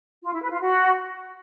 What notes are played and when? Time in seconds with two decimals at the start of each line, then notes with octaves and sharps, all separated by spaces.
0.24 F4
0.33 E4
0.42 B4
0.51 F4
0.60 F#4